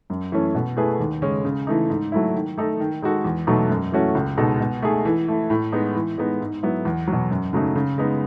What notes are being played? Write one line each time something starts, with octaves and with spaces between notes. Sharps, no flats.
F#2
E3 A3 C#4
B2
A3 E4 G#4 B4
D#2
C#3 G#3 C#4
C#3
E3 A3 D#4
G#2
F#3 A3 E4
D#3
A3 D#4 A4
D#3
G#3 D#4 F#4 A4
E2
B2 F#3 A3 D#4
F#2
E3 A3 C#4 F#4
C#2
B2 G#3 D#4 A4
B2
A3 D#4 G#4
E3
A3 E4
A2
G#3 B3 D#4
E3
G#3 B3 D#4
G#2
F#3 B3 E4
E2
F#3
B2
F#2
C#3 F#3 A3 D#4
C#3
G#3 B3 D#4